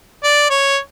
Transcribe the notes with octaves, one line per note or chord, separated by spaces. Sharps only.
D5
C#5